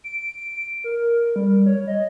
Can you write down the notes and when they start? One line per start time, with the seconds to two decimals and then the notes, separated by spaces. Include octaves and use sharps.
0.04 D7
0.84 A#4
1.36 G3
1.66 C#5
1.87 D#5